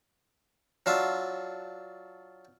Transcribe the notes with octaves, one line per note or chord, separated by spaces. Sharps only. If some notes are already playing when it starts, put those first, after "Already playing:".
F#3 D4 F4 E5